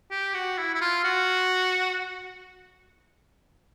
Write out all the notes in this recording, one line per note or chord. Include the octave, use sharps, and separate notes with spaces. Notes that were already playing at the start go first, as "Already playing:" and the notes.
G4
F#4
E4
E4
F4
F#4